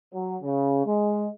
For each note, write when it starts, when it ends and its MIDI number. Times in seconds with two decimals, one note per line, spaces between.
0.13 0.36 54
0.42 0.84 49
0.85 1.28 56